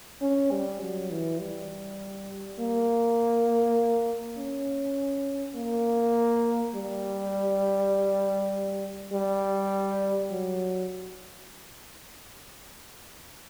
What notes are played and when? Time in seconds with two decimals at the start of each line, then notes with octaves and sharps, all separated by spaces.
0.22 C#4
0.52 G3
0.82 F#3
1.11 E3
1.41 G3
2.60 A#3
4.37 C#4
5.56 A#3
6.75 G3
9.13 G3
10.31 F#3